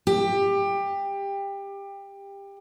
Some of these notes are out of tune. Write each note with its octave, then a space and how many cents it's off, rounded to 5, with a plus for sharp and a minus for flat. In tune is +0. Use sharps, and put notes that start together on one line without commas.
G4 +20